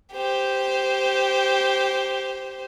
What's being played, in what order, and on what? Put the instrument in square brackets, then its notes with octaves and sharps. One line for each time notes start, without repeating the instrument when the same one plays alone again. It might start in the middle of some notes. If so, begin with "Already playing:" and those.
[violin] G4 C5